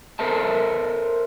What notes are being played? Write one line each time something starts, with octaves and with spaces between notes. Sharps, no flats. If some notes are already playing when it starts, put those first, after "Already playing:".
A4 A#4 C5 E5 A5